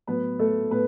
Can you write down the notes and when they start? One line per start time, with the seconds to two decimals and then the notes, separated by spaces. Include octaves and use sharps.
0.07 A2 F#3 B3 B4
0.39 A3 A4
0.71 A2 B3 B4